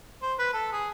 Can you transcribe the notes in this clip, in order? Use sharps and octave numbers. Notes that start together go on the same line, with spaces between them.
C5
B4
A4
G#4